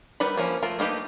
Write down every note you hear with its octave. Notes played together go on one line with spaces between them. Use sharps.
D#3 G3 B4 F#5 B5
F3 A#3 C#4
A3 F4 A#4
A3 A#3 D#4 G4 B4